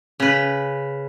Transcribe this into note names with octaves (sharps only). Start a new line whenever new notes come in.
C#3 B4